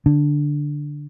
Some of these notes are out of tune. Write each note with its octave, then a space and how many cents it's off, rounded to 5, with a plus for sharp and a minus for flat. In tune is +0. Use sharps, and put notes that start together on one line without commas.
D3 +0 D4 +0